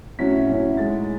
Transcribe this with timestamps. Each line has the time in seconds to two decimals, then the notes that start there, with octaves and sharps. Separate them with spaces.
0.19 A2 F#3 C#4 E4 B6
0.48 A2 F#3 C#4 E4
0.77 A2 G#3 D#4 A6